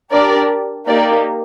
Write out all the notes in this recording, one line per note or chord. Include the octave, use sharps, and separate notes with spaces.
D4 G4 A#4 D5
A#3 D#4 G4 A#4 D5